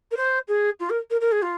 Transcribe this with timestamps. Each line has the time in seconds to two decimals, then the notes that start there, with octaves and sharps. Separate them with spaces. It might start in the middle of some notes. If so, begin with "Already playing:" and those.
0.11 A#4
0.16 C5
0.48 G#4
0.79 F4
0.89 A#4
1.10 A#4
1.20 A#4
1.31 G#4
1.42 F4